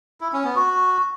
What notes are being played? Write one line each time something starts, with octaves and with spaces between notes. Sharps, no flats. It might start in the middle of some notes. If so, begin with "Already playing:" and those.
E4
C#4
B3
F#4